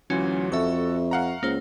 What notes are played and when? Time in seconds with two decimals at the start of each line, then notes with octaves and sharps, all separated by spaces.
0.10 D2 E3 F#3 C#4 F4
0.52 F2 F#4 A4 E5 C#6
1.11 F5 F#5 A#5
1.43 C#2 A#3 C5